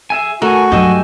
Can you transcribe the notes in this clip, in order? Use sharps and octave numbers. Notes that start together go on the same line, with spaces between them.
G#4 E5 G#5
A3 F#4 A#4 G#5
G2 F#3 G4 D#5 E5 G#5